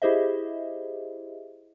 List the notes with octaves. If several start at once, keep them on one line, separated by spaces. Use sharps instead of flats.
E4 G4 G#4 C5 D#5 E5